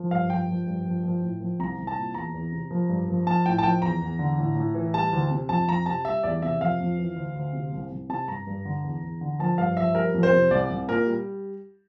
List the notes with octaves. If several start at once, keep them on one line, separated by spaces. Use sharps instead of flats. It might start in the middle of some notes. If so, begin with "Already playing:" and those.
Already playing: F3
G2 F5
F3 G5
F3
G2
F3
F3
A2
F3
C2 A#5
C2
A5
A#2
E2 A#5
E2
C3
F3
G2
F3
F3 A5
A2 G5
A5
F3 G5
E2 A#5
E2
D3
A2
A2
E3
G3 A5
D2
C3
F2 A5
F2 A#5
C3 A5
G3 E5
E2 D5
C3 E5
F2 F5
F2
E3
D2
D2
C3
C2
C2
C3 A5
G2 A#5
G2
D3
E2
E2
D3
F3 A5
G2 F5
F3 E5
G3 A#4
F2
C5
C3
C2 D5
C2
A#2 A#4
G3